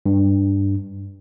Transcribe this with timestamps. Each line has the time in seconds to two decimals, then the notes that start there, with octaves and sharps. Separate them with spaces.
0.06 G2